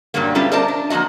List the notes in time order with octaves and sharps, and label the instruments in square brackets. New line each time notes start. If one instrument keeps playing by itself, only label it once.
[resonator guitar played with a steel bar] G2 A#2 F#3 G3 A#3
G3 A3 B3 C#4 D4 F4
A#4 C5 D5 D#5 A5
D4
F3 A#3 C4 F#4 D#5